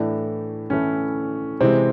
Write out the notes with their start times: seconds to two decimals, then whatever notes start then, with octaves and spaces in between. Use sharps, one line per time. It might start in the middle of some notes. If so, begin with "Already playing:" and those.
Already playing: A2 E3 A3 D4
0.70 A2 E3 A3 C#4
1.61 C3 E3 G#3 C4